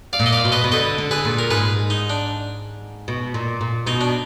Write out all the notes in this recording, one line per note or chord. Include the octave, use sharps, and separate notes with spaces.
D5 F5
A#2
D#5
D5 F5
B2
B4 D#5
B2
D3 B4 D#5
D3
G#4 B4
A#2
A#4
G#2 G#4 B4
D#4
D4
B2
A#2
A#2
B2 D#4
D4